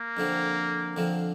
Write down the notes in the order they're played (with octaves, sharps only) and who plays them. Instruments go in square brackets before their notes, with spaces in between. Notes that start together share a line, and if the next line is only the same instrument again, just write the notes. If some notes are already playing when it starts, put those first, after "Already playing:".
Already playing: [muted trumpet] A#3
[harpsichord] F2 D3 F3 C4
F2 D3 F3 C4